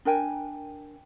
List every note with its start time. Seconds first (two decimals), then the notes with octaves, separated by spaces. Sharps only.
0.05 D4 A#4 G5 G#5